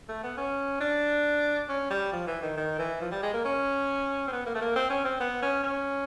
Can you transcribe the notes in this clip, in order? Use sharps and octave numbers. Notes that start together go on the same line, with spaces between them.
A3
B3
C#4
D4
C#4
G3
F3
E3
D#3
D#3
E3
F3
G3
G#3
A#3
C#4
C4
B3
A#3
A3
A#3
C4
C#4
C4
B3
C#4
C#4